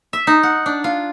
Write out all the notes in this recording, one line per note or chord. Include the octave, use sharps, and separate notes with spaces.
E5
D#4
F#5
D4
F4